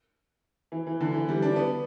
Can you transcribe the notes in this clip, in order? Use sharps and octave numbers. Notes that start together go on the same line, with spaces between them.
E3
E3
D3
E3
G3
D4
B3